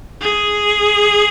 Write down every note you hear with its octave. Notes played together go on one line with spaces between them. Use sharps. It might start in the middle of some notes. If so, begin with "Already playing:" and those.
G#4